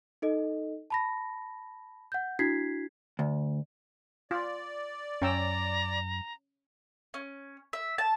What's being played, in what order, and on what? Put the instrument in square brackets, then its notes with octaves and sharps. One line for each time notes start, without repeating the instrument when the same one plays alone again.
[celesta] D#4 A4 D#5
A5 B5 A#6
F#5 G6
D4 E4 F#4 G#6 B6 C7
[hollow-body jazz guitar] D2
[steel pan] F4 [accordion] D5
[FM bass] F#2 [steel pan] C#4 G5 E6 [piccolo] A#5
[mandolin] C#4
E5
A5